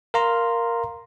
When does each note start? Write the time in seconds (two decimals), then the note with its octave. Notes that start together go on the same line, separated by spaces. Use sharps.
0.14 A#4 F5 A#5 C6